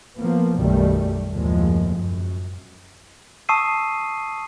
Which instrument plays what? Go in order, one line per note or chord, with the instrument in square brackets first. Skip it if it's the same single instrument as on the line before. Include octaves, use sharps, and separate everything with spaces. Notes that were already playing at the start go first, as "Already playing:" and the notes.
[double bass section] F3 A#3 B3
B1 F#2 D#3 G3 A3
F#1 D#2 A2 F3 G#3
F#2
[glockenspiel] A5 C#6 D#6 E6 C7 D#7